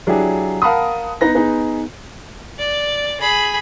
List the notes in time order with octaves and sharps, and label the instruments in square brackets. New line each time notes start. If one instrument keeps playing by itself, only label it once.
[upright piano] F#3 D4 E4 G4 G#4
A#4 F5 F#5 A5 B5 D#6
B3 D#4 B4 A#6
B3 D#4 G#4 B4
[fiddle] D5
G#4 B5